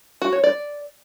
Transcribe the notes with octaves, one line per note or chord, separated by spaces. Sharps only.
F#4
C#5
D5